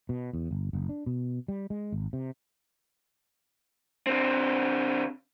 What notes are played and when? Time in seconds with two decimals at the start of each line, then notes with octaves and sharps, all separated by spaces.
0.09 B2
0.33 E2
0.51 G1
0.73 F#1
0.89 D4
1.06 B2
1.48 G3
1.70 G#3
1.92 G#1
2.13 C3
4.07 D3 C4